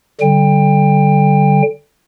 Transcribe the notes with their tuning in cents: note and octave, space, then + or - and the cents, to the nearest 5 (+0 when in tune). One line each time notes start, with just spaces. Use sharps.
D3 -10 G3 -30 G5 +25